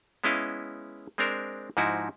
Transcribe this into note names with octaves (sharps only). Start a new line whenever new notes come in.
G#3 B3 C#4 E4 D#5 F5
G#3 C4 D4 A#4 C5
G#2 F3 D#4 E4 F#4